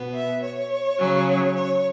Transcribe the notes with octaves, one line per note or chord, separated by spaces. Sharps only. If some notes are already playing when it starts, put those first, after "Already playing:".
Already playing: B2 B3
E5
C#5
C#3 F#3 C#4
C#5